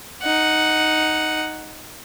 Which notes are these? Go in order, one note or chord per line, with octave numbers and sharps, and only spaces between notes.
D#4 F#5